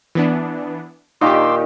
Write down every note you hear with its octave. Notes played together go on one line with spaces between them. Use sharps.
E3 B3 D4
A#2 D#3 D#4 G4 C6 D6 E6